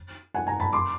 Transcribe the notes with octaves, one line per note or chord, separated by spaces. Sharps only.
F#5 G#5
G#5 A#5
A5 B5
C6 D6